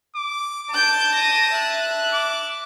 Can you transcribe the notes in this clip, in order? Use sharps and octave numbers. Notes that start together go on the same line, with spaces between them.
D6
A5 G6 D7
A#6 D#7
E5 F#6
D6